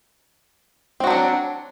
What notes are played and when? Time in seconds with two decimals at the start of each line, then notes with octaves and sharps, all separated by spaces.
1.00 C4
1.04 F#4
1.07 F#3
1.10 D4